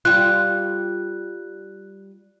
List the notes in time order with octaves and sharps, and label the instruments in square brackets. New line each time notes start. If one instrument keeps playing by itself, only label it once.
[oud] G3 F4 [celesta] F#6